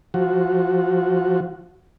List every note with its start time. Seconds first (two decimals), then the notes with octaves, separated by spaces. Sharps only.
0.14 F3 F#4